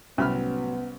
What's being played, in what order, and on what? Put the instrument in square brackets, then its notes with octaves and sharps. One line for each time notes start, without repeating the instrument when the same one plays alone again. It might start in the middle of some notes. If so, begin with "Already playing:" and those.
[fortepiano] C2 B5 F6 [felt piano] A2 C3 F#3 [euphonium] B3 [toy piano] C#4